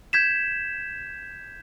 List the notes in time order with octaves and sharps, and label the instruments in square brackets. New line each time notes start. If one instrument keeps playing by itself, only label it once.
[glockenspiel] G6 G#6 B6 E7